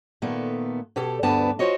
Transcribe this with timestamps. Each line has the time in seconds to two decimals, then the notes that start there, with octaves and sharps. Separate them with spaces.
0.22 A#2 D#3 A3 B3
0.96 B2 G4 A4
1.23 D2 G2 B3 D4 B4 A5
1.59 F4 F#4 C5 C#5 D#5